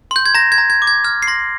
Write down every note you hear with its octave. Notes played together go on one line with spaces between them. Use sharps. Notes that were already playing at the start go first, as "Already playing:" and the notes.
C6 G6
G#6
A#5 A#6
G#6
A#5
G#6
D6
G#6
F6 G#6
C7
C6 A#6